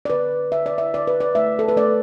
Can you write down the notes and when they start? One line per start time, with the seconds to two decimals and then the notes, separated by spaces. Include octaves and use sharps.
0.05 D5
0.10 D3 B4
0.52 D3 E5
0.66 D5
0.78 E5
0.94 D3 D5
1.07 B4
1.20 D5
1.35 A3 E5
1.59 A4
1.68 B4
1.77 A3 D5